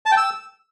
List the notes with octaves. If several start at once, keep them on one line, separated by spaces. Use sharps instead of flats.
A5
G5
E6